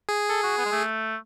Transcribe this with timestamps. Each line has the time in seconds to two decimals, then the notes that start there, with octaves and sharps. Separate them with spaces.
0.09 G#4
0.29 A4
0.43 F#4
0.57 B3
0.65 G#3
0.72 A3